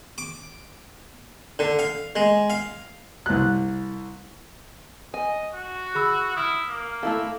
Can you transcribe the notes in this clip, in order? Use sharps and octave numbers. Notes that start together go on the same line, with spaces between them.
D6
D3
F5
G#3
F5
C2 F#6
D#5 G#5
F#4
G#4 B5 E6
E4 D#6 F6
A#3
A3 E4 A4 F5